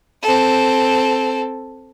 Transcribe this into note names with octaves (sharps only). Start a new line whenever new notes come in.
C4 A4